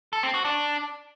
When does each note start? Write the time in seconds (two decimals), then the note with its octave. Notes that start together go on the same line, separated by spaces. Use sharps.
0.13 A4
0.23 C4
0.34 F#4
0.45 D4